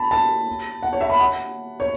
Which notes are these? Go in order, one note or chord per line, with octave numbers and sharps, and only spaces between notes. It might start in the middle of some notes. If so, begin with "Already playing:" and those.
Already playing: A5 B5
A5
F#5
C#5
E5
B5
F#5
C#5